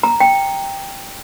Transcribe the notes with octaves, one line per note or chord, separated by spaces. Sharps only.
A#5
G5